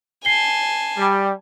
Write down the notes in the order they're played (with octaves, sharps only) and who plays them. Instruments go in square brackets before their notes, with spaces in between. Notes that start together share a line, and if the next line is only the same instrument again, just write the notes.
[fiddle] G#5 A5 [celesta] C7 G7
[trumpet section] G3